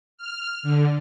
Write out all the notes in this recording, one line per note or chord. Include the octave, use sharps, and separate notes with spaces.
F6
D3